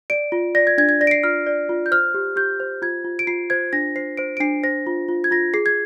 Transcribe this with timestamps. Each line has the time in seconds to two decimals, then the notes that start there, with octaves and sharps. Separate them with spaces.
0.10 D5 D7
0.32 F4
0.55 D5 A#6
0.67 G#6
0.78 D4 G#6
0.89 G#6
1.01 D5 A#6
1.07 D7
1.11 C7
1.24 F4 F6
1.46 D5
1.69 F4
1.86 G6
1.91 C5 F6
2.14 G4
2.36 G4 G6
2.60 C5
2.82 F4 G#6
3.04 F4
3.19 D7
3.27 F4 C7
3.50 C5 G#6
3.73 D4 A#6
3.96 C5 C7
4.17 C5 D7
4.37 D7
4.40 D4 C7
4.63 C5 A#6
4.87 F4
5.08 F4
5.24 G#6
5.31 F4 A#6
5.54 G#4 C7
5.66 G#6